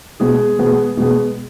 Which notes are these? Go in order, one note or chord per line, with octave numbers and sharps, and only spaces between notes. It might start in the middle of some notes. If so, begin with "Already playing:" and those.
B2 G#3 B3 G#4
B2 G#3 B3
B2 G#3 B3